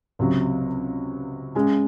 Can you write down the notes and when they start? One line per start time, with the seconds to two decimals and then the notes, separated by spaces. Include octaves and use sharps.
0.19 C#2 C3 F#3
1.55 C#3 G#3 C#4